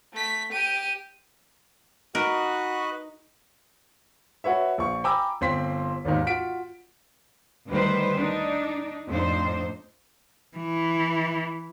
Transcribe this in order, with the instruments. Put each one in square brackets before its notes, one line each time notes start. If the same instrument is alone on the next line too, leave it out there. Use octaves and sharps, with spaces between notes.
[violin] A3 B6
G4 D#7
[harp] D#4 [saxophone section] F#4 [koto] A#4 [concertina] B4 D#5 F#6
[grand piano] F#4 B4 C#5 E5
A#1 C#6
G5 G#5 A#5 B5 D6 E6
G1 C4 C6 B6
G#1 D#2 G#2 D#3
F4 F#4 B6 D7
[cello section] D2 D#3 G3 B4 C5
D4 D#4
F2 A2 D4 D#4 C5
[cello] E3